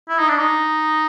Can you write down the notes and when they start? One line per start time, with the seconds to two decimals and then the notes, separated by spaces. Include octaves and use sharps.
0.09 E4
0.19 D#4
0.29 D4
0.39 D#4